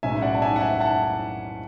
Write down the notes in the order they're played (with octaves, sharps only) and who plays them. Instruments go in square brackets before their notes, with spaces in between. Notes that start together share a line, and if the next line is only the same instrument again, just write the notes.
[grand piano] B1 A2 G#3 C#4 E4 E5 G#5
D5 F#5
A5
E5 G#5
F#5
E5 G#5
F#5 A5